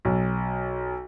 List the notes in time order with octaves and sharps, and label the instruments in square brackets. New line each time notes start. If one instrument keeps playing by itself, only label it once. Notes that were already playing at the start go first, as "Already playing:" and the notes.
[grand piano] B1